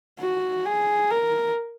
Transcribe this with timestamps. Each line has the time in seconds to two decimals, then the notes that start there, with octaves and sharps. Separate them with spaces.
0.19 F#4
0.65 G#4
1.10 A#4